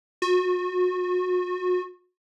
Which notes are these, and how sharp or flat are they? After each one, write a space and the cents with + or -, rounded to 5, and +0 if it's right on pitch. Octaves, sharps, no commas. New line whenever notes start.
F#4 -35